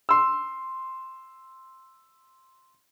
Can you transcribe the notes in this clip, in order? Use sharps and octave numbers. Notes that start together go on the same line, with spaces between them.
C6 E6